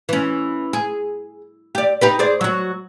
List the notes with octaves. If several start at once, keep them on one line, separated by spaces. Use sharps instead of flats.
E3 C#4
G#4
G4 D5
D#4 G4 B4
G#4 C5 D5
F#3 F#4